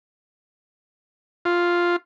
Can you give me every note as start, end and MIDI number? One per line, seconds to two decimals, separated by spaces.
1.45 1.96 65